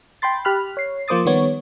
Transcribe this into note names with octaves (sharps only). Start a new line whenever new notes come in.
G5 B5 C6 A6
G4 B5 F6 F#6
C#5 C7
F3 A#3 C5 D6 D#6 A6
D#3 G3 B3 C#5